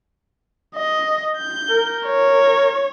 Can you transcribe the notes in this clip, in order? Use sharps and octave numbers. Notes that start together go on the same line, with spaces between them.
D#5
G6
A#4
C#5